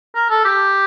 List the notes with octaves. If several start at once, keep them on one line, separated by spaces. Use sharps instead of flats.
A#4
A4
G4